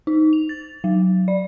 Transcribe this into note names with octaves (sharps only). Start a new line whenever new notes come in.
D#4
F7
A6
F#3
D5